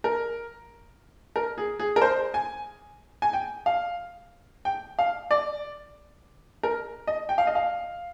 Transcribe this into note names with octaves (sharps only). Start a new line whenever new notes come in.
A#4
A#4
G#4
G#4
A#4
C5
G#5
G#5
G5
F5
G5
F5
D5
A#4
D#5
G5
F5
D#5
F5